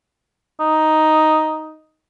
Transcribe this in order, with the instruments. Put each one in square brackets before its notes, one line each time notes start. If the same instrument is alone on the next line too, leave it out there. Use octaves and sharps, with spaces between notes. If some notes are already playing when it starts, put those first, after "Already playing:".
[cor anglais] D#4